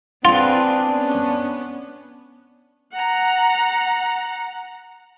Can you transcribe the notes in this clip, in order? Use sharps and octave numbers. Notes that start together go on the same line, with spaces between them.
C4 D4 F4 G#4 B4
B3 C#4
F#5 A#5